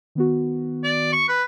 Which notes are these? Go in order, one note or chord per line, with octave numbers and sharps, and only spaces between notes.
D#3 B3 F#4
D5
C#6
B4